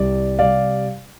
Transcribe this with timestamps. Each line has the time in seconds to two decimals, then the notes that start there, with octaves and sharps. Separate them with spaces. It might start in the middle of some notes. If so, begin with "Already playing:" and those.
Already playing: C2 C3 G3 D5
0.39 C3 G3 D5 F5